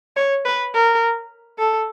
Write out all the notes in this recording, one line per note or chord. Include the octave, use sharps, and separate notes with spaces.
C#5
B4
A#4
A4